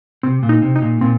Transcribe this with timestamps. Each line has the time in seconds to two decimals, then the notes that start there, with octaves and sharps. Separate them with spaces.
0.23 C3 C4
0.43 A#2
0.49 D#4
0.62 C3
0.76 D#4
0.82 A#2
1.01 A#2 C4